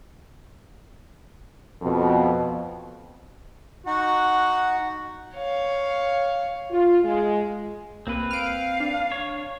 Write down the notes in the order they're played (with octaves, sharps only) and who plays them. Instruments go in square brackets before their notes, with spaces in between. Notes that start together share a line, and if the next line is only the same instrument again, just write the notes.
[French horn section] F2 B2
[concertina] D#4 F#5 [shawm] F#4
[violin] C#5 F5
[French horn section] F4
G#3
[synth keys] C2 A#3 [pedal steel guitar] C4 B4
[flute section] F5 [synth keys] F6 D7
[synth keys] D4
[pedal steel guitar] C#5